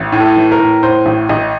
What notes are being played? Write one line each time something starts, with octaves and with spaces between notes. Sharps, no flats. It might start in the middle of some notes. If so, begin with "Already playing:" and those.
Already playing: A1
A2
A4
E3
A#4
A2
A2 C5
A1
A1 D#5